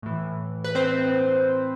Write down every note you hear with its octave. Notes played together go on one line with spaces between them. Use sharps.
A2 E3
B4
C4 C5